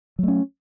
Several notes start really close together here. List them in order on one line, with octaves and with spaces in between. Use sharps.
F#3 A3 C#4